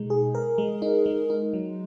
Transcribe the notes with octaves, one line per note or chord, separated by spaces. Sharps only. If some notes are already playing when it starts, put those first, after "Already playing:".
Already playing: B2 G#3 D#4
G#4
A#4
G#3
D#4
G#3
D#4
F#3